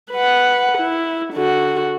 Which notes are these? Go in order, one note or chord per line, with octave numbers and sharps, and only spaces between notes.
B4 F#5
E4
D3 F#4